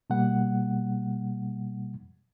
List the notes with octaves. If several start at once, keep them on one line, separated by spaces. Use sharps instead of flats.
B2 G3 A#3 F#5